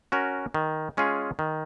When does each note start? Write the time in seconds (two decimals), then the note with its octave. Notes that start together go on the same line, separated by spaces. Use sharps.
0.12 C#4 F#4 A#4
0.54 D#3
0.97 G#3 C#4 F4 G#4
1.39 D#3